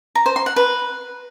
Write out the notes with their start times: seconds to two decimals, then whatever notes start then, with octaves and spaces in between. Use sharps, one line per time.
0.15 A#5
0.26 C5
0.36 C6
0.46 F#5
0.56 B4